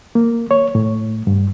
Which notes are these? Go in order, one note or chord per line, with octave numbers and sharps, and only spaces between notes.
A#3
C#5
A2
G2